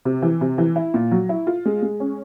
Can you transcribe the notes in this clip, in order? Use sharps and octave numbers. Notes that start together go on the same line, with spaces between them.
C3
E3
C3
E3
E4
A#2
F#3
E4
F4
G#3
G#3
C#4